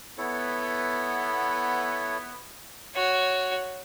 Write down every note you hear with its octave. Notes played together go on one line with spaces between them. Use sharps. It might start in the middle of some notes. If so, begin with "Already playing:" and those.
B3 E4 A4 C#5
F#4 C#5